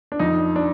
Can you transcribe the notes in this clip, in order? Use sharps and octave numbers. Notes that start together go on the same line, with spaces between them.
D4
F2 D#4
D4